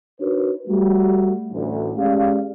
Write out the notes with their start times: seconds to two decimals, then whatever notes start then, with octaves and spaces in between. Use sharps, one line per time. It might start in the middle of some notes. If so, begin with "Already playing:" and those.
0.20 D4 D#4 F#4 A#4 B4 C#5
0.68 G3 A3 F#4
1.51 A1 D2
1.97 G#3 C#4 G4 D5 F5